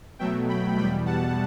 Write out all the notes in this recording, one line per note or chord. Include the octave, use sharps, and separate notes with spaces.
B2 F#3 A3 E5 G5
G5 B5
E2 B2 G3 G5 B5
F#5 A5